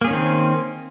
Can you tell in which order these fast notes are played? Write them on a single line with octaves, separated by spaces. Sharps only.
A#3 G#4 C#4 D#3 C4